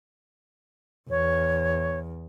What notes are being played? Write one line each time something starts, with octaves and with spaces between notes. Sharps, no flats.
E2 C#5